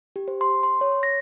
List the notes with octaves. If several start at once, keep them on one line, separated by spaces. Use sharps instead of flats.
G4
C5
C6
C6
C#5
A#6